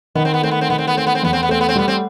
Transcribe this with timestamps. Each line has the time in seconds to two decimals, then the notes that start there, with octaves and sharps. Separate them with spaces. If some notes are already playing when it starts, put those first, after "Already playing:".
0.15 D#3 B3
0.25 C4
0.34 B3
0.42 A3 C4
0.51 B3
0.61 C4
0.70 D#3 B3
0.78 C4
0.87 B3
0.95 A3 C4
1.07 B3
1.15 C4
1.23 E2 B3
1.33 C4
1.43 B3
1.49 A3 C4
1.61 B3
1.69 C4
1.76 G3 B3
1.88 C4